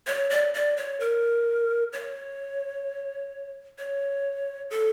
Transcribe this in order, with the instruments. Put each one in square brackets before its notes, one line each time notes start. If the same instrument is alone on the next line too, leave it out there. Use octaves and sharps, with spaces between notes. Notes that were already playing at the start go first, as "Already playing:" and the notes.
[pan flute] C#5
D5
D5
C#5
A#4
C#5
C#5
A4